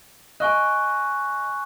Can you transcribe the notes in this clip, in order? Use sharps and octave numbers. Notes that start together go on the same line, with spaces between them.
D#5 G#5 C#6 F#6